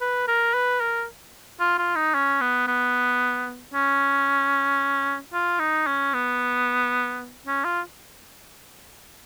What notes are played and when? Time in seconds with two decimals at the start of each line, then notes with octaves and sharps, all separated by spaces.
0.01 B4
0.28 A#4
0.54 B4
0.81 A#4
1.60 F4
1.78 F4
1.96 D#4
2.14 C#4
2.41 B3
2.67 B3
3.74 C#4
5.33 F4
5.60 D#4
5.87 C#4
6.14 B3
7.46 C#4
7.64 F4